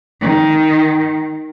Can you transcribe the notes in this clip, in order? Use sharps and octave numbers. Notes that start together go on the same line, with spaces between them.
D#3